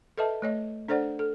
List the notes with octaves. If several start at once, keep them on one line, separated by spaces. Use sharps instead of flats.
A4 B4 D#5 E5 A5
A3 C#5 D#5
D4 A4 C5 D5 F#5
A4